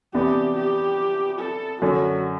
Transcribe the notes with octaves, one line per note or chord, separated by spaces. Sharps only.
C3 E3 B3 D4 G4
G4
A4
F#2 D3 F#3 F#4